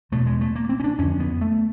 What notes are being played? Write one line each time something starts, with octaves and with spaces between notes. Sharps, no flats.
E2 B2 A3
G#3
A3
A#3
C4
C#4
D4
F2 D3 C#4
B3
A3